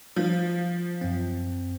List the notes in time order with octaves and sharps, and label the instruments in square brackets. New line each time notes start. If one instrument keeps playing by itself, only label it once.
[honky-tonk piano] F3
[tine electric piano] F#2 C4